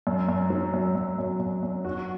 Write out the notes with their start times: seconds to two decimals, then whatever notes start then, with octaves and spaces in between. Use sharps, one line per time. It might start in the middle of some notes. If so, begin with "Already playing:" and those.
0.07 F#2
0.29 F#2
0.50 F#3
0.74 F#2
0.95 F#2
1.18 F#2
1.40 F#2
1.63 F#2
1.85 F#4